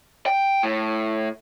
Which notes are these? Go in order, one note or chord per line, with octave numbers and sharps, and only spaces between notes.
G5
A2